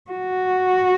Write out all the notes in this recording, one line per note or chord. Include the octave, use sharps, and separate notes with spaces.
F#4